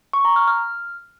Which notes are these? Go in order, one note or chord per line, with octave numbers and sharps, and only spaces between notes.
C#6
A#5
F6
F6